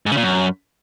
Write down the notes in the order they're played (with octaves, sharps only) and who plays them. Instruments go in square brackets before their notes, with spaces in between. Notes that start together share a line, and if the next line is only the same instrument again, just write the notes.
[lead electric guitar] G#2
C#3
A#2
F#2